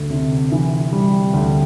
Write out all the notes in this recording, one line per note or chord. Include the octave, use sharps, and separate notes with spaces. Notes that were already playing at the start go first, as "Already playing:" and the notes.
Already playing: D2
C3
E3
G3
D2